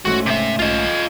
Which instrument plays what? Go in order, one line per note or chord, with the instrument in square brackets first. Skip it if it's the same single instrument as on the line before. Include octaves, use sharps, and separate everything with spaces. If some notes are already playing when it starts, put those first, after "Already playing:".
[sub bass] D#1 [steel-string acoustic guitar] G#2 A3 C#4 [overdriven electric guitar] F#4
[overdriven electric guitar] C3 E5
[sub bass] B1 [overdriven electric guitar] F4 D#5